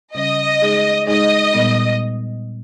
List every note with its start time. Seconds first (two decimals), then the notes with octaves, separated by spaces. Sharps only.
0.14 C#3 G3 C#4 D#5
0.61 G#3 D#4 G#4
1.07 G#3 D#4 G#4 D#5
1.53 A#2 G3 B3